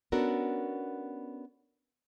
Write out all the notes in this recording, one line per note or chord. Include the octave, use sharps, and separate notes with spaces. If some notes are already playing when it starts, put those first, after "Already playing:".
B3 C#4 D4 F#4 A4 A#4